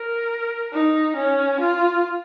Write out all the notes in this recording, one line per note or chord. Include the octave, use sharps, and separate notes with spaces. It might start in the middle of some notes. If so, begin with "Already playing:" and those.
Already playing: A#4
D#4
C#4
F4